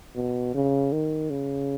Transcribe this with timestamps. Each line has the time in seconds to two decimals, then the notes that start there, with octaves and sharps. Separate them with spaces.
0.15 B2
0.54 C#3
0.92 D#3
1.30 C#3